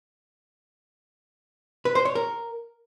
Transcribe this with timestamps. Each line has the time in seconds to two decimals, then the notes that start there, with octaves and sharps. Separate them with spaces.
1.85 B4
1.95 C5
2.05 C#5
2.15 A#4